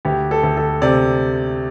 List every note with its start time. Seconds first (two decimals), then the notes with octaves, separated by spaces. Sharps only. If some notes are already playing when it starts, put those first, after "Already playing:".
0.05 D2 G4
0.31 A4
0.43 D2
0.57 A4
0.82 C3 D5